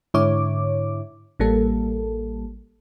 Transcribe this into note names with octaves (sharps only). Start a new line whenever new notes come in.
G#2 D3 E4 C#5 D6
A1 G3 A#3 A4